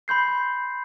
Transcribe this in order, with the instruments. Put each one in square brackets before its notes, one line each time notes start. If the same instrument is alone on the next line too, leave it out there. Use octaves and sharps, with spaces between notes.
[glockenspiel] B5 C6 G6 C7